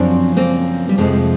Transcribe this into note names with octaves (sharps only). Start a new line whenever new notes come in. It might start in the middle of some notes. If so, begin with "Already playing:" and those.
Already playing: F#2 C#3 F3 C4 D4
A#3 C4
G3
F2 C3 F3 G#3